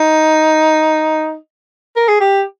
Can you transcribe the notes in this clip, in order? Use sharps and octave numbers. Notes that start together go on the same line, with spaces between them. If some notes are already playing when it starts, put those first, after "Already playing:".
Already playing: D#4
A#4
G#4
G4